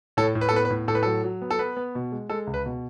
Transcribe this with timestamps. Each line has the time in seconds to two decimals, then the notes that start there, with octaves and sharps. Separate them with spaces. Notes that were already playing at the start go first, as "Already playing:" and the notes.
0.17 A2 A4 C#5
0.35 A2
0.41 B4
0.49 A4
0.53 B3 B4
0.65 B4
0.70 A2
0.88 A2 A4
0.95 B4
1.03 F#3 A4
1.24 F#3
1.42 B3
1.51 A4
1.59 B3 B4
1.77 B3
1.95 B2
2.12 G#3
2.29 G#3 A4
2.47 C#2
2.54 B4
2.66 B2